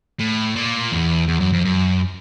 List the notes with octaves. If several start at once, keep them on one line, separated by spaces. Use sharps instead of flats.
A2
A#2
E2
E2
F#2
F2
F#2